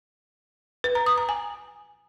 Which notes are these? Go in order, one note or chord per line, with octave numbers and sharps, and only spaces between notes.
B4
A#5
D#6
A#5
G#5